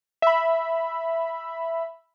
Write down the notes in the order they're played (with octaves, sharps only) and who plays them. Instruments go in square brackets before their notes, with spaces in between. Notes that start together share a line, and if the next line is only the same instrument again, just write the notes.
[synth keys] E5 B5